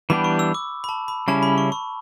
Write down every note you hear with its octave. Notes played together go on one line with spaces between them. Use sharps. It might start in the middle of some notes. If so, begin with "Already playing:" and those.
E3 G3 B3 D4 G4 B5
C#6
E6
D6
B5
A5
B5
C#3 G3 C#4 E4 A5
B5
C#6
C#6